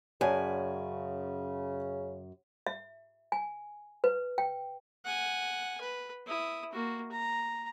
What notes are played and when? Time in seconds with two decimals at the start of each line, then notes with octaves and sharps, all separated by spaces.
0.21 F#2 C#3 D5 G#5 A5
2.67 E5
3.32 G#5
4.04 B4
4.38 G5
5.05 F#5 G#5
5.81 B4
6.26 E4 D#6
6.72 A#3 F#4
7.11 A#5